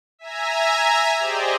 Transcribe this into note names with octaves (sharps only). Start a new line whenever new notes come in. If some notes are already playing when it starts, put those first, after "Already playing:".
E5 G#5 A#5
G4 G#4 C5 D5 D#5